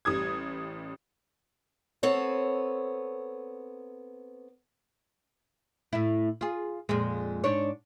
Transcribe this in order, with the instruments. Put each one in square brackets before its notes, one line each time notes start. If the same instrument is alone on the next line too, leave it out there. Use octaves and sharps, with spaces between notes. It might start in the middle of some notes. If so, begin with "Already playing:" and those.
[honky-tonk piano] A1 G3 D#6 G#6
[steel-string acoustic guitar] B3 C4 A4 C#5
[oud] A2 E4
F4 G#4
F2 A#2 G#3
G#2 D4 C#5